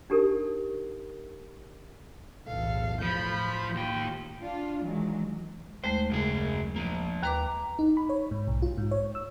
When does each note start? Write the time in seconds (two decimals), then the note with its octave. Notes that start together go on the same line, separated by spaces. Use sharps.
0.10 D4 D#4 G4 A4 A#4
2.47 B1 E2 A2 A4 F5
3.01 A2 F3 B5 G6
3.75 D#2 F4 G5
4.43 D4 F4
4.83 D#3 E3 F#3 G#3
5.84 D#2 G#3 A3 C5
6.10 F#2 C#3 G#4
6.76 F3 A#3
7.23 D#2 B4 A#5 D6
7.79 D#4
7.97 B5
8.09 C#5
8.31 G#2
8.47 B1
8.62 F4
8.78 G#2
8.91 C#5
9.15 E6